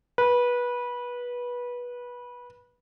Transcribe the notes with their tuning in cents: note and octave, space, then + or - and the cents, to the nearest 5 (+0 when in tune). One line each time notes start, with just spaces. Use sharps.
B4 -20